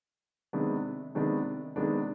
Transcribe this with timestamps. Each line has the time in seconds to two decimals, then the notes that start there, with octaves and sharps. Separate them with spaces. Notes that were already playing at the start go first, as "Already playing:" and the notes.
0.53 C3 D#3 G#3 B3 D4
1.15 C3 D#3 G#3 B3 D4
1.76 C3 D#3 G#3 B3 D4